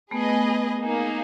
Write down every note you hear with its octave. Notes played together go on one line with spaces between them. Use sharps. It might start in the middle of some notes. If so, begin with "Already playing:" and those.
A3 B3 G#4 B4 D#5
A3 B3
A#3 D#4 G#4